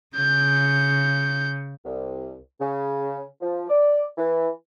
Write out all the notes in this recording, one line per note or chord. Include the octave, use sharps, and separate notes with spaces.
C#3 G6
C2
C#3
F3
D5
E3